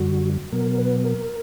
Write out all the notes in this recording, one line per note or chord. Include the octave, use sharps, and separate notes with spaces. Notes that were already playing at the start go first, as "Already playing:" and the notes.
Already playing: F#2 D3 G3 F#4
B2 F#3 B3 A#4
A#4
B4
A#4